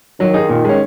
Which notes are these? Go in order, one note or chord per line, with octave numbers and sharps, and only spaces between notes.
D#3 F#3
D#4 G#4
A#2
G#3 C#4